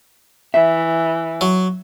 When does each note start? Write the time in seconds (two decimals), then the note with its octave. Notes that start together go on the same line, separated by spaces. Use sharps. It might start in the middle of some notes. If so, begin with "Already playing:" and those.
0.54 E3 E5
1.41 F#3